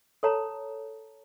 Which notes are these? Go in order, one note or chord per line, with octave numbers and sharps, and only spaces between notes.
A4 C#5 A5 A#5